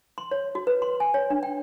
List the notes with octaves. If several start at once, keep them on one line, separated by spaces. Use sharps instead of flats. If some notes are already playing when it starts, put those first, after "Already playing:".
C6
C#5
F#4
B4
C6
G#5
C#5
D4
G5